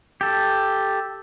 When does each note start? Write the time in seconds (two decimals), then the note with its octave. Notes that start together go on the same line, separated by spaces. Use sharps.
0.21 G4 A4